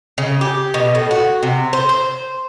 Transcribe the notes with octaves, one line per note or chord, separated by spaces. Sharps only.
C#3
G4
B2
A2
F#4
C3
C5
C5